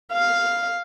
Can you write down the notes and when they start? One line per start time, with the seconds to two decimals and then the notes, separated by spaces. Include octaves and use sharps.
0.13 F5